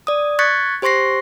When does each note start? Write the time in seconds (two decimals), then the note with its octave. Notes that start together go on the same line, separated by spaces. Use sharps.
0.07 D5 D#6
0.39 C#6 F#6 G#6 A6 B6 C#7
0.82 G4 C5 C6 C#6 A#6 C7